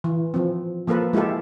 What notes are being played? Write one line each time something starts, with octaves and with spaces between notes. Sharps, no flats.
E3
F3 C4
F3 A#3 F4 A4 B4
G#3 E4 F4 G4 A4